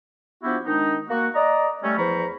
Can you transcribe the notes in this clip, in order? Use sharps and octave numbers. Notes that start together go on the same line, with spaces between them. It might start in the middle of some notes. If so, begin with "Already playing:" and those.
F3 B3 D4 E4 F#4 G4
D#3 G#3 D4 D#4
A#3 F#4
D5 D#5 A#5
G3 A3 C#4
E2 F3 C5 A#5 B5 C#6